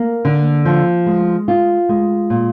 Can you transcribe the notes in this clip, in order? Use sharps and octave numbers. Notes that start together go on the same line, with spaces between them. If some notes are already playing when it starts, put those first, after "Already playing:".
Already playing: A#3
D3
F3
G#3
F4
G#3
A#2